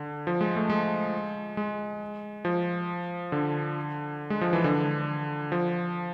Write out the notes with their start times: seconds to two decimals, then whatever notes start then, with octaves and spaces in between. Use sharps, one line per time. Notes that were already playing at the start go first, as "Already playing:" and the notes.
Already playing: D3
0.27 F3
0.41 G#3
0.56 A3
0.70 G#3
1.57 G#3
2.45 F3
3.32 D3
4.30 G#3
4.41 F3
4.53 E3
4.64 D3
5.52 F3